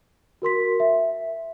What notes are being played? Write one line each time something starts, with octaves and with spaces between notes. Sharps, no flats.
F#4 A#4 C6 B6
E5